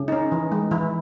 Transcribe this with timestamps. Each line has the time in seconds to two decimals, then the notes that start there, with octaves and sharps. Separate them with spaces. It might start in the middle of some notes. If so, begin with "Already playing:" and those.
Already playing: C#3
0.08 D#4
0.12 C#4
0.32 E3
0.52 G#3
0.71 E3 E4